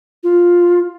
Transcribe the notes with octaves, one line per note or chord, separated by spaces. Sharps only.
F4